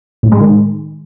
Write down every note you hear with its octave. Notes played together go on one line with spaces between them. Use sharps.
A2
G#3
D#3